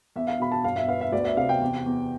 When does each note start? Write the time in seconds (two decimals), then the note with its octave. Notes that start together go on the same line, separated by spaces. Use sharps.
0.16 E2 E5
0.27 F5
0.40 B2 B5
0.52 A5
0.64 G1 F5
0.76 E5
0.88 B3 F5
1.01 E5
1.12 D2 D5
1.25 E5
1.37 C3 F5
1.49 G5
1.62 E2
1.86 E2